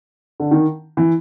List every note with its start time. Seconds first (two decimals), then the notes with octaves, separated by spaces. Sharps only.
0.40 D3
0.51 D#3
0.97 E3